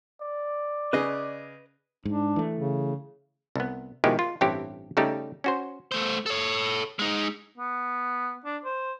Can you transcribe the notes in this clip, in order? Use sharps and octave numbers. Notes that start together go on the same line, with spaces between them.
D5
C#3 G#4 B4 D#5
G#2 D4
E3 A3
C#3
C2 B3
B2 D#3 F3 G#3 E4 G4
F4
A1 G2 C4 E4 G4 C#5
C#3 G3 A3 D#4 G4
C#4 F#4 C5
A3 C5
A4 C#5
G#3 D#4
B3
D4
C5